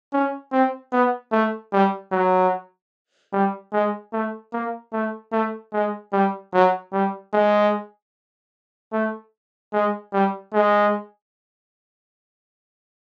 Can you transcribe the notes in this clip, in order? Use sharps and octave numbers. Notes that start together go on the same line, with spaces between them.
C#4
C4
B3
A3
G3
F#3
G3
G#3
A3
A#3
A3
A3
G#3
G3
F#3
G3
G#3
A3
G#3
G3
G#3